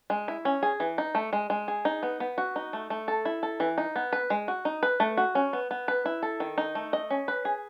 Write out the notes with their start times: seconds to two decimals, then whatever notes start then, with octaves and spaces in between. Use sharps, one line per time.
0.10 G#3
0.28 E4
0.45 C#4
0.63 G#4
0.80 E3
0.98 D#4
1.15 A3
1.33 G#3
1.50 G#3
1.68 G#4
1.85 D#4
2.03 B3
2.20 B3
2.38 F#4
2.56 D#4
2.73 A3
2.90 A3
3.08 A4
3.25 E4
3.43 A4
3.60 E3
3.78 D#4
3.96 B3
4.13 B4
4.30 G#3
4.48 F#4
4.65 D#4
4.83 B4
5.00 A3
5.17 F#4
5.35 C#4
5.53 B3
5.71 B3
5.88 B4
6.06 E4
6.23 A4
6.40 D#3
6.58 D#4
6.75 A3
6.93 D#5
7.10 C#4
7.28 B4
7.45 G#4